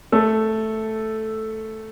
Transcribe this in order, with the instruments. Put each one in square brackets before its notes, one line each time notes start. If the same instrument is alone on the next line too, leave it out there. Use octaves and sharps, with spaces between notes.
[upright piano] A3 A4